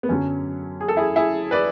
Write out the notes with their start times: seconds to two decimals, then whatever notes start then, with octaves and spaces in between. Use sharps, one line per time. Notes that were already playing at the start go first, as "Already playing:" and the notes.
0.03 B3
0.09 F#2 D3 F#3 C#4
0.81 G#4
0.88 A4
0.97 E4 G#4
1.16 E4 G#4
1.51 B4 D5